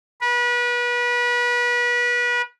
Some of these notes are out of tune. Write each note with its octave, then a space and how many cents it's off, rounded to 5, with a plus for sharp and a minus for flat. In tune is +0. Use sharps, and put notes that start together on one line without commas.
B4 -30